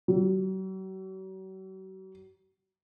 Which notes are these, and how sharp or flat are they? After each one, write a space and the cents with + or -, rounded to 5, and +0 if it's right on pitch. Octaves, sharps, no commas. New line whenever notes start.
F#3 +40